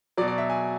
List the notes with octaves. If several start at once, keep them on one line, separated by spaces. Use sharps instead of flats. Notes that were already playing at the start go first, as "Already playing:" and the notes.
B2 F#3 D5
D5
E5
G#5